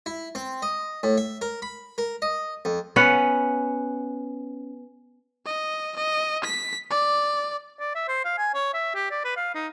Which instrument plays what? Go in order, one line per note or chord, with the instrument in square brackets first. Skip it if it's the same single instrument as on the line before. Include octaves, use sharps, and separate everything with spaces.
[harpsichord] E4
C4
D#5
A2
E5
A#4
B5
A#4
D#5
F2
[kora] B3 C#4 F#5
[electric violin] D#5
D#5
B6
D5
[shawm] D5
E5
C5
F5
G#5
C#5
E5
G4
D5
B4
F5
D#4